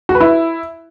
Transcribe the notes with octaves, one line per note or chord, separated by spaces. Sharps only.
F#4
B4
E4